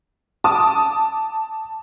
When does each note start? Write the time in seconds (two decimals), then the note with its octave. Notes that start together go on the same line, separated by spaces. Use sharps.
0.44 A5 D6 D#6